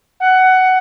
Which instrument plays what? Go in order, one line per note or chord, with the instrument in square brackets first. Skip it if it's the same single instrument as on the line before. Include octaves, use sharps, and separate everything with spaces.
[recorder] F#5